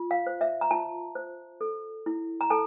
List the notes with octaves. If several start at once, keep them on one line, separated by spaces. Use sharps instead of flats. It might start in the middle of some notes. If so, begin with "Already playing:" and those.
Already playing: F4
F5
C5
E5
A#5
F4 A5
C5
A4
E4
A#5
A4 A5